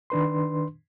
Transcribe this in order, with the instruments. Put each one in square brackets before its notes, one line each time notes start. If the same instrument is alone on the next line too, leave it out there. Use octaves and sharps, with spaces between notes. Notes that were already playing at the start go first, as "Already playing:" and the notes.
[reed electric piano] D#3 D4 B4 C6